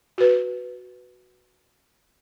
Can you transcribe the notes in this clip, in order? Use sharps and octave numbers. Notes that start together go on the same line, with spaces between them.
F#4 B4